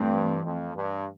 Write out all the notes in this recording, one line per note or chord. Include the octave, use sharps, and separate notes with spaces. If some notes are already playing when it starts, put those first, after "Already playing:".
Already playing: G2 E3 A3 C4
F2
G2